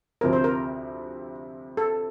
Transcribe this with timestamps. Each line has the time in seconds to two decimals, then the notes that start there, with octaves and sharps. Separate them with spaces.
0.21 D2 C3 F3 C4 A#4
0.33 C5
0.44 A#4
1.77 A4